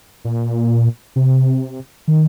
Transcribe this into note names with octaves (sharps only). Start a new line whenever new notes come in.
A#2
C3
D#3